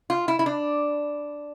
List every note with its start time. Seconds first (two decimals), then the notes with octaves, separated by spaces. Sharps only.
0.10 F4
0.28 E4
0.39 E4
0.46 D4